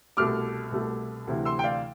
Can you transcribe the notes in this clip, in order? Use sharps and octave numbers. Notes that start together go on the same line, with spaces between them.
C2 B2 A3 D6 F6
C2 B2 A3
D2 C3 E3
C6 E6
G5
D5 F5